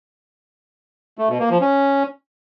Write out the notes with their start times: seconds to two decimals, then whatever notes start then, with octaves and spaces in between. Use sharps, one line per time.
1.18 A3
1.29 B2
1.40 A#3
1.50 F3
1.61 C#4